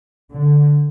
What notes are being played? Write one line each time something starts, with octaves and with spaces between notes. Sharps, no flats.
D3